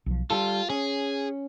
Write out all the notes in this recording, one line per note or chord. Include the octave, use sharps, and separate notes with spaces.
B1 F3
G3 D4 F4 A4
C#4 G#4